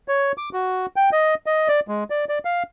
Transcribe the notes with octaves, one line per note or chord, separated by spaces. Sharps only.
C#5
D6
F#4
G5
D#5
D#5
D5
G#3
D5
D5
F5